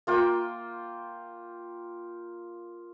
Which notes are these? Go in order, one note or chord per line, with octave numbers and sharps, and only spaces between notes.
A#3 F4 G5